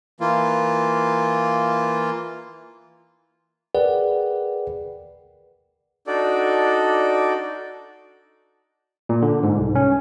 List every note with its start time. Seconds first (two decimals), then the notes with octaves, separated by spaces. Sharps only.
0.20 E3 A#3 F4
3.75 G#4 A#4 B4 D5 F#5 G5
6.07 D4 D#4 F#4 A4 D5
9.09 A#2
9.22 D3
9.43 G#2
9.58 C2
9.75 C#4